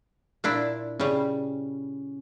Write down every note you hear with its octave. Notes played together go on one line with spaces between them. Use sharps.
A#2 D4 E4
C#3 G3 C#4